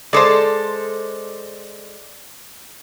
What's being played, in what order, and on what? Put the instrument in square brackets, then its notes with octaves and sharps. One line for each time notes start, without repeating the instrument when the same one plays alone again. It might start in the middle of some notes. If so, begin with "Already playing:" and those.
[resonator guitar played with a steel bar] G#3 A4 [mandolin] C5 D5